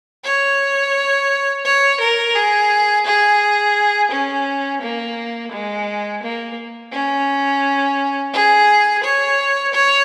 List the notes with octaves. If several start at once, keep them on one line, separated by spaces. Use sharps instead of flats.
C#5
C#5
A#4
G#4
G#4
C#4
A#3
G#3
A#3
C#4
G#4
C#5
C#5